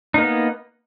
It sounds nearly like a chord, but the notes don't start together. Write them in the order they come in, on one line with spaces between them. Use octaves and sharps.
D#4 A#3 B3